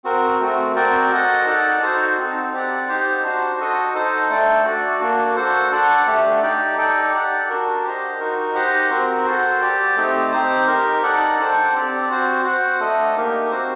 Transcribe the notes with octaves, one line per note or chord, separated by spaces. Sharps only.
C4 F#4 A#4
A3 C4 F#4
C4 F#4 A#4 D5 G5
F#4 A4 D#5 F#5
D#4 A4 D5 F#5
D#4 F#4 A4 C5
C4 D#4 A4
C4 G4 D5 F#5
D#4 G4 C5
D4 F#4 C5
F#4 A4 D#5
D#4 A4 C5
A3 D4 A4 D5 G5
F#4 A4 D5
A#3 D4 F#4
F#4 A4 C5
D4 A4 D5 F#5
A3 D4 G4
D#4 G4 D5 G5
D#4 A4 D5 G5
G4 D5 F#5
D4 F#4 A#4
G4 C5 D#5
D#4 F#4 A#4
D#4 G4 C5 D#5 F#5
C4 F#4 A#4
F#4 A4 C5
G4 D5 G5
A3 C4 D#4 G4
C4 D#4 G4 C5
D#4 G4 A#4
D#4 A4 D5 F#5
D4 A4 C5 G5
C4 G4 D5
C4 F#4 C5
F#4 C5 F#5
A3 D4 A4 D#5
A#3 D#4 G4 A#4
C4 F#4 C5